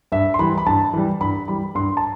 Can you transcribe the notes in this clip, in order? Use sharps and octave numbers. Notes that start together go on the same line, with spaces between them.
G2 E5
C6
E3 G3 B5
B5
G2 A5
E3 G3
G2 B5
E3 G3 B5
G2 C6
A5